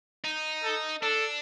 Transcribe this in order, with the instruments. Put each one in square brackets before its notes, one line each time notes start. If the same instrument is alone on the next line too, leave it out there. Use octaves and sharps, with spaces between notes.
[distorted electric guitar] D#4
[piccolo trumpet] A4
[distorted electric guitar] D4 [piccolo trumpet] A4